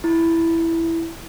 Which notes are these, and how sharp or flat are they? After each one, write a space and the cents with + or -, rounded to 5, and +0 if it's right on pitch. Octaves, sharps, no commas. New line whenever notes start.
E4 +5